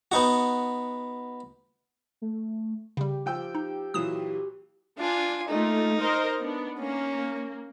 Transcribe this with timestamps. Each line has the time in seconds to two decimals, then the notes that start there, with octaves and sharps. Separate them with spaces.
0.12 B3 D#4 F#4
2.22 A3
2.97 C#3 G3 G4
3.26 F3 G5 E6
3.55 D#4
3.94 A#2 E3 F#3 D#6 E7
4.98 D4 F4 G#5
5.48 A3 A#3 D#4 F4
5.99 A#4 C5 D#5
6.41 B3 D4
6.79 A#3 C#4